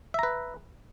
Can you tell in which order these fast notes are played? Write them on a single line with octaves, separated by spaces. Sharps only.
E5 A#5 B4